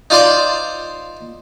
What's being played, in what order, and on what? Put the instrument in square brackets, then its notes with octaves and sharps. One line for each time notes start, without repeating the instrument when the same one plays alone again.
[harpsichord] D#4 F4 C5 D5 C6